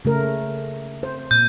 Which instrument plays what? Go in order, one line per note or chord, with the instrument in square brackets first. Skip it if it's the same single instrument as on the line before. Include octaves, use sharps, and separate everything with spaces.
[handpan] C#3 A3 A#4
C5
[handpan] A#2 [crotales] G6